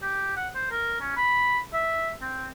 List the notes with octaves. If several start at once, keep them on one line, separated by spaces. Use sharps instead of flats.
G4
F#5
C5
A#4
C#4
B5
E5
C4